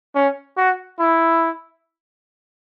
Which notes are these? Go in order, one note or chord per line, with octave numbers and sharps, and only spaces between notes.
C#4
F#4
E4